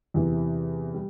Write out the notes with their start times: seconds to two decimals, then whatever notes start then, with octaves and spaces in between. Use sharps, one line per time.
0.14 E2 C3 E3
0.94 G3